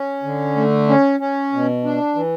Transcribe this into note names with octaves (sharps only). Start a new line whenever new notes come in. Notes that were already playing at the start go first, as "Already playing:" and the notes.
Already playing: C#4
D3
A3
C#4
C#4
B2
D4
E3